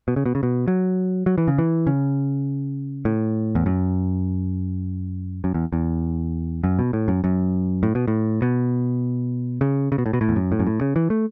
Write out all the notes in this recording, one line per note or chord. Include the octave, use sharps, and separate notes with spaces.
B2
C#3
B2
C#3
B2
F#3
F#3
E3
C#3
E3
C#3
A2
E2
F#2
F#2
E2
E2
F#2
B2
A2
F#2
F#2
A2
B2
A2
B2
C#3
C#3
B2
A2
B2
A2
E2
F#2
A2
F#2
A2
C#3
E3
A3